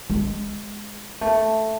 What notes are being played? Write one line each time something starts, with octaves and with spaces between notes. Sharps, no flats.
G#3
A3